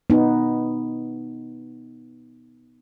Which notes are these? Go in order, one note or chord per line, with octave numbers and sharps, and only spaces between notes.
B3 D#4